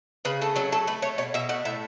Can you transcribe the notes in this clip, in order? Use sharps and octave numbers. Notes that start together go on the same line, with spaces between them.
C#3 B4
A3 A4
F#3 A4
A3 A4
A3 B4
A3 C#5
B2 C#5
B2 E5
A3 F#5
A2 E5